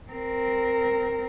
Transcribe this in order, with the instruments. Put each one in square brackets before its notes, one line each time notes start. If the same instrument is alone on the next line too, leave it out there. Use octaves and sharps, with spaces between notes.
[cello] C4 A#4